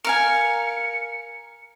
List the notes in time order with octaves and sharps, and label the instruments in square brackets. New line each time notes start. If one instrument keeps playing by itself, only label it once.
[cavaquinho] A#4 F5 G#5 [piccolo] C#7